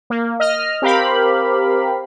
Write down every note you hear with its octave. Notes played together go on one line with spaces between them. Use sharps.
A#3
D#5 F6
C4 G4 A#4 F5 B5